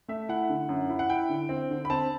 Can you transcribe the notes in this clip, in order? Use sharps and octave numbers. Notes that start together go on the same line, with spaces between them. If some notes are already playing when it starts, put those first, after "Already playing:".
A3 E5
E4 F#5
D3
F#2
E4
F#5
E4 G5
D3
C4
D3
B5
C4 A5